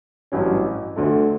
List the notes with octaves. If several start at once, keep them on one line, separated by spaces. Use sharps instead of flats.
A1 G2 F#3 C#4
D2 D3 A3